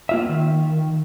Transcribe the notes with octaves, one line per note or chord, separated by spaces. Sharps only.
A#3 F4 E5
D#3